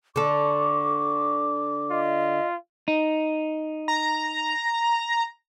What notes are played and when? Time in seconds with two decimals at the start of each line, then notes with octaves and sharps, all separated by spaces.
0.16 D3 A4 C#6 D6
1.90 F4 D#5
2.88 D#4
3.88 A#5